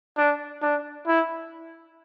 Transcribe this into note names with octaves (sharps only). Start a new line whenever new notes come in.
D4
D4
E4